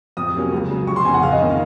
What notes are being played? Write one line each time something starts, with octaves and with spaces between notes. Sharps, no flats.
F2 D#6
C3 F#3 A#3 C#4
C#2
C#3 F#3
F1 C#6
C6
F2 C#3 G#5
F#5
F2 F5
D#5
D#3 A#3 C#4
F5